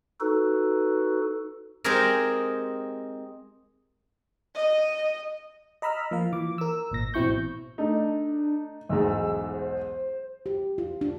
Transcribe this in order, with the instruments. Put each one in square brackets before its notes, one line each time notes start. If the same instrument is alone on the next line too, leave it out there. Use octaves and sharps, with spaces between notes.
[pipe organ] D#4 F#4 A4 B4
[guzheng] G#3 C4 D#4 G4 G#4 A#4
[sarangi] D#5
[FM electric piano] D#5 A#5 B5 E6 F6
F3 A#3 F5
E3 D6
A#4 E6
G#1 A#2 A#6
A1 B2 C4 E4 C#6 G6
[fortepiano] A3 D#4 [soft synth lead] D4
[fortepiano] B1 E2 G#2 [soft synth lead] E6
[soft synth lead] C5
[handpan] G4
F4
D4